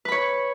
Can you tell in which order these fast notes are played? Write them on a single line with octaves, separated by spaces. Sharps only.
B4 B5 C#5